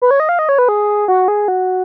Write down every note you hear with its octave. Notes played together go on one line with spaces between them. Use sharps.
B4
C#5
D#5
F5
D#5
C#5
B4
G#4
F#4
G#4
F#4